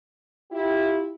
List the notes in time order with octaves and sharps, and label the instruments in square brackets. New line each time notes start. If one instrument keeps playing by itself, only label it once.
[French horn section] E4 F4 G4